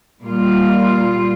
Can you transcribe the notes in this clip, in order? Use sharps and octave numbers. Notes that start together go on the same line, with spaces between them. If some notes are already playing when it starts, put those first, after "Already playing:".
A#2 G3 A#3 F4